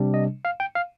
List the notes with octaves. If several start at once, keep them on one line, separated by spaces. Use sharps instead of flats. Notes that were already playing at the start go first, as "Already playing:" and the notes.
Already playing: C3 G3 D4
D#5
F5
G5
F5